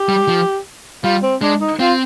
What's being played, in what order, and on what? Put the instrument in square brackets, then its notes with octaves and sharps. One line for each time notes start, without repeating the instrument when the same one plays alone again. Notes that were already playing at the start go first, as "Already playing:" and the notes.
Already playing: [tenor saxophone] G4
[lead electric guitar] G3
F3
[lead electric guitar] G3 [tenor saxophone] F4
[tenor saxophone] C4
[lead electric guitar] G#3 [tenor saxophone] D4
[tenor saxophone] D#4
[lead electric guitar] C4 [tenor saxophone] F4